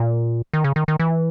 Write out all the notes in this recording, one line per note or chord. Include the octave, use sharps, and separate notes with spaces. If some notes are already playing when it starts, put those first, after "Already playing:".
Already playing: A#2
D#3
C#3
D#3
D#3
E3